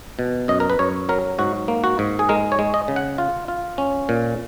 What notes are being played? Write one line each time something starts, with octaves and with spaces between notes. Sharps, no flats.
B2
F#2 D#5
A#4
B4
F#2 C#5
F#3 A#4
G#2 F#4
A#3
F#4
G#2
G#4
G#3 A#4
C#5
G#3
D#5
C#3
F#5
F4
F4
C#4
A#2